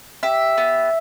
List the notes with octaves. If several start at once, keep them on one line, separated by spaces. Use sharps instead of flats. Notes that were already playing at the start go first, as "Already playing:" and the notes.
G4 E5
B3